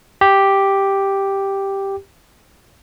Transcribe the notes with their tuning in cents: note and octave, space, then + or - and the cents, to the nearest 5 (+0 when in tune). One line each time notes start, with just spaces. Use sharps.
G4 +0